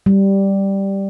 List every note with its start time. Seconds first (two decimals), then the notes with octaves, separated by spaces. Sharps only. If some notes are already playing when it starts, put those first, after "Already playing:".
0.06 G3